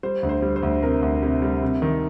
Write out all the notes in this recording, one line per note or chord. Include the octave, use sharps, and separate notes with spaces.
G3 C5
D2
C5
G3
C5
D2
C3 A#4
D2
C3
G3
C3
D#3